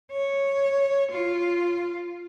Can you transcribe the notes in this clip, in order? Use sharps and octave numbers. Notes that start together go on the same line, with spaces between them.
C#5
F4